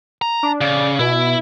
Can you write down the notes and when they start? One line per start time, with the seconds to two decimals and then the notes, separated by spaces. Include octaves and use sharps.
0.22 A#5
0.43 D4
0.61 C#3 D5
0.99 B2 E4